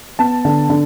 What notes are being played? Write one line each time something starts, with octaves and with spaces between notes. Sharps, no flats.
B3 A5
D3
D3